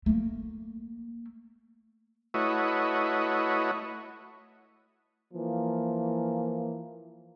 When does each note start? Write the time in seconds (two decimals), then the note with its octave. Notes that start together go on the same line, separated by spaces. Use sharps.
0.06 A3 A#3
2.34 A3 E4 F#4 B4 C#5 D#5
5.33 E3 F3 A#3